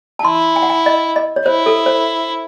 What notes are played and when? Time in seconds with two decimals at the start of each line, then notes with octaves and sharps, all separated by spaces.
0.19 A5
0.25 E4 C6
0.56 G#5
0.62 F#5
0.70 G#5
0.86 D#5
1.16 D#5
1.36 C#5
1.46 E4 C5
1.66 A4
1.86 C5